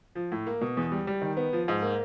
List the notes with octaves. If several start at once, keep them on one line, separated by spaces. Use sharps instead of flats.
F3
A2
A#3
B2
E2
G3
G3
D#3
B3
F3
G#2
A#3